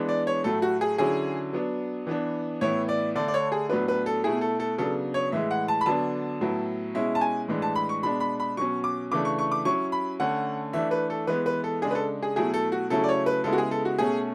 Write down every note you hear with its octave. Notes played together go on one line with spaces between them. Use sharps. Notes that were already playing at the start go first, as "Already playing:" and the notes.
Already playing: E3 G#3 B3 D4
D5
C#5
A2 F#3 A3 A4
F#4
G#4
D3 F#3 C#4 E4 G#4
F#3 B3 D4
E3 B3 D4
A2 E3 B3 E4 C#5
D5
D3 A3 D4 D5
D5
C#5
G#4
A2 F#3 B3 D4 B4
B4
A4
B2 A3 E4 G#4
A4
A4
C#3 F#3 B3 D4 A4
C#5
A2 E3 G#3 E5
F#5
A5
B5
D3 F#3 B3 D4 A5
A2 F#3 B3 E4
B2 G#3 C#4 E4 E5
A5
G#5
A2 E3 G#3 D4
A5
B5
C#6
B2 G#3 D4 B5
B5
B5
B2 F#3 C#4 C#6
D6
C#3 E3 A3 D4 D6
C#6
C#6
D6
F#3 C#4 E4 C#6
B5
D3 A3 C#4 F#5
E3 A3 D4 E5
B4
A4
E3 G#3 B3 B4
B4
A4
C#3 G#3 D4 G#4
B4
A4
G#4
B2 F#3 A3 E4 G#4
A4
F#4
C#3 F#3 A3 C#4 E4 A4
D5
C#5
B4
C#3 G#3 B3 E4 A4
F#4
G#4
A4
F#4
B2 A3 C#4 G#4